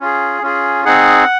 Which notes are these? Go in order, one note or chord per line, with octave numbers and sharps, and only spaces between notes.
C#4 F4 G#4
C#4 F4 G#4
C4 D#4 G#4 F#5